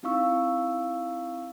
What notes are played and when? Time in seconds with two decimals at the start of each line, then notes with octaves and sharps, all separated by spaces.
0.03 C4 D#4 E4 F5 C#6 E6